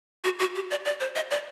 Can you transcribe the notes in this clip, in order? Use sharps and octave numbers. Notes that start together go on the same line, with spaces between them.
F#4
F#4
G4
D5
D5
C5
D#5
D5